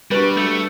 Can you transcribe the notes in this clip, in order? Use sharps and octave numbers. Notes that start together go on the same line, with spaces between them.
G3 D4 F#4 B4
A3